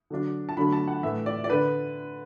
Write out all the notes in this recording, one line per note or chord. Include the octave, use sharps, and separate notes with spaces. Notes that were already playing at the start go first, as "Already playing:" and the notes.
D3 F#3 D4
A5
D3 F#3 A3 D4 B5
A5
F#5
A2 E3 A3 E5
D5
D5
D3 B4